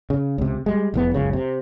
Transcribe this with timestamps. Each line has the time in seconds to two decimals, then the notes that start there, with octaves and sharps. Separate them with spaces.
0.10 C#3
0.38 C#2 C3
0.66 G3 G#3
0.94 F1 E2 B3
1.14 F#1 C#2 C#3
1.33 C3